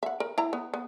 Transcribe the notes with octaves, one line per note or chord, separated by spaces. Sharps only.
E5 F#5
A#4
E4 A#5
B3
B3